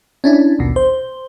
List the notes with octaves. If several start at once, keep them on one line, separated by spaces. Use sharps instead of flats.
C#4 D4 E4
A#1 D#2 B2
C5